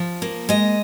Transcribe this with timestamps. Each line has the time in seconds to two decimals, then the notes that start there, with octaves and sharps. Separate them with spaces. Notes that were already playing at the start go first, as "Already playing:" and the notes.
Already playing: F3
0.22 A#3
0.49 G#3 D#5